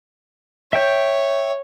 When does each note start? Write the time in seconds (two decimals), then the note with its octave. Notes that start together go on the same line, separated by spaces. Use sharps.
0.73 C#5 E5 G5 G6